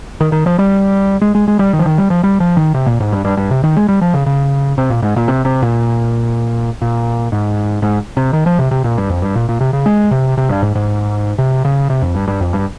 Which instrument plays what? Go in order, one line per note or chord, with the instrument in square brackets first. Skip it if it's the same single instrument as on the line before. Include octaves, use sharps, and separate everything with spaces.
[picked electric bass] D#3
D#3
F3
G3
G#3
G#3
G#3
G3
D#3
F3
D#3
G3
F3
G3
F3
D#3
C3
A#2
G#2
G2
G2
G2
C3
D#3
G#3
G3
F3
C#3
C#3
C3
A#2
G#2
A#2
C3
C3
A#2
A#2
G#2
G#2
C3
D#3
F3
C3
C3
A#2
G2
F2
G2
A#2
A#2
C3
C#3
G#3
C3
C3
G2
G#2
G#2
C3
C#3
C3
F2
G2
G2
F2
G2